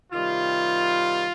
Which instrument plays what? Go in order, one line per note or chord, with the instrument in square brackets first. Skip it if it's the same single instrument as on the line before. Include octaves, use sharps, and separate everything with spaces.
[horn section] C3 D#3 G3 F4